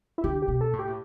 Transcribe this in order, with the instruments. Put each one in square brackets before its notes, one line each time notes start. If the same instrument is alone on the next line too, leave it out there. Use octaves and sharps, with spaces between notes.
[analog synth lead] E4
[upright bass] D3 [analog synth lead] G4
[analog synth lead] G4
[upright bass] B2
[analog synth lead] A4
[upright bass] A2
[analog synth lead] G4
[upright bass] A2